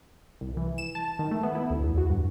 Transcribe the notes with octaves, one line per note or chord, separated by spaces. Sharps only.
C2
E3
E7
A5
D#3
A3
B3
E4
D2
E2
F#4
G2